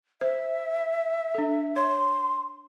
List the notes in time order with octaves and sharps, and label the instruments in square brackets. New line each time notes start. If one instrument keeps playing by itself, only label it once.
[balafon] C5 [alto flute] E5
[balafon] D4 A4
[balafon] C#5 [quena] C6